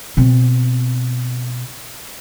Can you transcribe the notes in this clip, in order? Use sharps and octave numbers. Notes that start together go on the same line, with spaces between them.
B2 C4